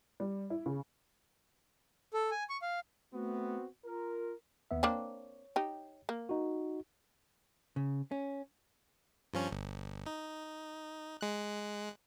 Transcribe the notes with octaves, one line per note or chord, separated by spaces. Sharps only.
G3
E4
C#3
A4
G#5
C#6
F5
A3 B3 C4 F#4
F4 A#4
D#2 B3 E5
A#3 C4 D4 C#5
D#4 G4
A#3
D#4 F#4
C#3
C#4
G2 F3 C#4
G1
D#4
G#3 F#6